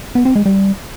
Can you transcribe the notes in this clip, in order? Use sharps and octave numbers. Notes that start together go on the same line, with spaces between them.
B3
C4
G#3
G3